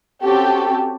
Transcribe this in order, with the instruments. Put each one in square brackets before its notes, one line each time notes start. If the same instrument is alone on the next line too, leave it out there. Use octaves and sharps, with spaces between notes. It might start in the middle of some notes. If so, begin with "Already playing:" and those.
[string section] C4 C#4 F#4 G4 A4